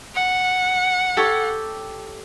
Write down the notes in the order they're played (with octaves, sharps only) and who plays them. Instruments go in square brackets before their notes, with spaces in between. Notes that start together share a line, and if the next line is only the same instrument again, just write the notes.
[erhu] F#5
[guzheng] G4 A4 C#5